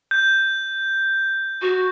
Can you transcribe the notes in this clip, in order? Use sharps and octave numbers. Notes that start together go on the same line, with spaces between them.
G6
F#4